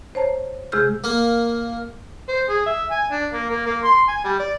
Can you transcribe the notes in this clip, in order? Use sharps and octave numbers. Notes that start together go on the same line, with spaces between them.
C5 C#5 A5 A#5
C3 G#3 G#4 E6 F6 G6
A#3
C5
G#4
E5
G#5
D4
A#3
A#3
A#3
C6
G#5
G3
D5